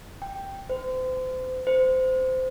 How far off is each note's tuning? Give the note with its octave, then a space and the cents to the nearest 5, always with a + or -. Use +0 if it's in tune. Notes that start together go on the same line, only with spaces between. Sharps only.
G5 +0
C5 -35
C5 -20